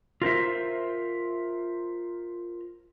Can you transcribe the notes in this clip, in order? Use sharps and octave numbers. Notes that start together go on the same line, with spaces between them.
F4 A#4 C5 E5